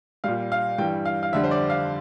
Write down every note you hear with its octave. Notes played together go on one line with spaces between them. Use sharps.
A#2 G3 F5
F5
G2 E3 G3 G5
F5
F5
F2 D3 G3 E5
C5
D5
F5